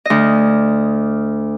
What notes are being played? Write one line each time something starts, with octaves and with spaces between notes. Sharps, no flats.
D2 D#5